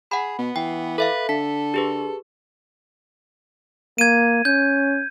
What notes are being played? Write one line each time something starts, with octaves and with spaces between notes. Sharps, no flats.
G#4 F#5 B5
B2 B3
E3 G5
A4 B4 E5 F5
D3 A4 B6
G4 G#4 B4
A#3 G#6 D#7
C#4 G6